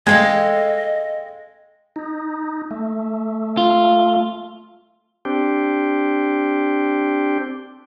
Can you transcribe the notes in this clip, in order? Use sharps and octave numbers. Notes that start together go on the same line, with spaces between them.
G#3 A4 D#5 F5 G5 G#6
D#4
A3
F4
C4 D4 G4